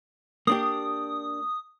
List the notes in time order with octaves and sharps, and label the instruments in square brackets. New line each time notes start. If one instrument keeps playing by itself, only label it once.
[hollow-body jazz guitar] A#3 D4 G4 [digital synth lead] D#6